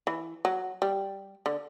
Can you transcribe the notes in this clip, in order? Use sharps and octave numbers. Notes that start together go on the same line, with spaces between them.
E3
F#3
G3
D3